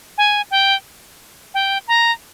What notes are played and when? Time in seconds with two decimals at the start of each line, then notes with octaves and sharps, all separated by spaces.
0.18 G#5
0.51 G5
1.54 G5
1.88 A#5